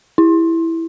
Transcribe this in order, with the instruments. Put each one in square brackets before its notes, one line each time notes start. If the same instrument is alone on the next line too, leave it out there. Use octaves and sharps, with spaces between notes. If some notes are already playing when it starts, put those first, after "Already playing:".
[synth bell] E4